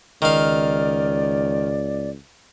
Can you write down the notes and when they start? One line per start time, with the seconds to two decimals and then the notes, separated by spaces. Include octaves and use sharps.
0.22 C#2 D#3 D5 F5